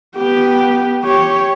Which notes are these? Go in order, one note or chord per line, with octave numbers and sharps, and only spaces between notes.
B3 G4
G4 C#5